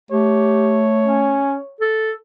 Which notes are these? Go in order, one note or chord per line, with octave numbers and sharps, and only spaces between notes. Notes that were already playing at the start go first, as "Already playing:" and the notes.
A3 G4 C#5
C#4
A4